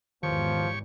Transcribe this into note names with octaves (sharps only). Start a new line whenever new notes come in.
G#1 E2 B2 D#3 F3 G4 C#5 C#6